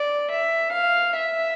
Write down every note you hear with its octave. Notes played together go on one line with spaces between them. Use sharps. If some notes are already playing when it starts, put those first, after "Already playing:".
Already playing: D5
E5
F5
E5